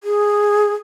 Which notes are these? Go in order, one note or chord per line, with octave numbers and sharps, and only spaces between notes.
G#4